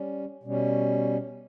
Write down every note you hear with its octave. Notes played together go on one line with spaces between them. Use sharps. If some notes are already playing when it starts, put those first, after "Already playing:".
Already playing: G3 C#4
B2 G3 C#4